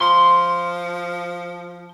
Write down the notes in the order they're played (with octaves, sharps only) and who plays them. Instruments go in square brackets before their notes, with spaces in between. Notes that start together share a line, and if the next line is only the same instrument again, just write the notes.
[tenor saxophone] F3 [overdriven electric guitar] C6